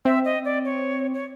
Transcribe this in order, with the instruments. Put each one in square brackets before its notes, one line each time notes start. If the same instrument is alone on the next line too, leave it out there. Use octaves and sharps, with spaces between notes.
[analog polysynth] C4 [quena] E5
[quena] D#5
D5
C#5
C#5